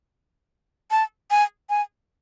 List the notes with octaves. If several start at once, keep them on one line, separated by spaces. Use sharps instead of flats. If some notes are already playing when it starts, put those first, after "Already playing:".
A5
G#5
G#5